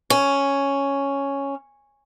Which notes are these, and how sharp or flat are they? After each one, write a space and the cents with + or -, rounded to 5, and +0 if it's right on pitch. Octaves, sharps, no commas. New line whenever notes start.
C#4 +0